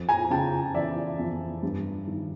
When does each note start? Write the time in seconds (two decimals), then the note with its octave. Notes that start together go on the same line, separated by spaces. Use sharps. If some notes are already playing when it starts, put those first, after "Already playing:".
Already playing: F2
0.09 G#5 A#5
0.30 C#3 G5 A5
0.74 E3 D5 E5
1.19 F2
1.63 G2
2.07 D#3